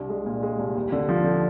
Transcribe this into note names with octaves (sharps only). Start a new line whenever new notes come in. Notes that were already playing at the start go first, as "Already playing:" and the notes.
Already playing: C2 D4
G#3
A#2
G#3
C2
D#2
D3
F3
D3